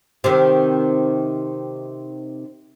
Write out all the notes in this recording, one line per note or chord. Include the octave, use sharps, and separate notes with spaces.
C3 D#3